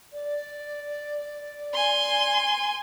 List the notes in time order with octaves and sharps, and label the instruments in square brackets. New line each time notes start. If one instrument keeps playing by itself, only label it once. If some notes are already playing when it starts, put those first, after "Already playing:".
[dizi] D5
[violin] G#5 C6